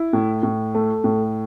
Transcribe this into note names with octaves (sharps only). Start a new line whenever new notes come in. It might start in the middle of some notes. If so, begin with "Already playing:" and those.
Already playing: E4
A2
A2
A3
A2